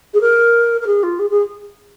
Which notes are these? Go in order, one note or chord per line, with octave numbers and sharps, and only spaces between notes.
G#4
A#4
A#4
G#4
F4
G#4
G#4